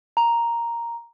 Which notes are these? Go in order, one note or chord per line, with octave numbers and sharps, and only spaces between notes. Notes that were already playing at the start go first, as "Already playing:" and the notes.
A#5